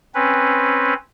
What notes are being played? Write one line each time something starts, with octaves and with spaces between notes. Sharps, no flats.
C4 C#4 B4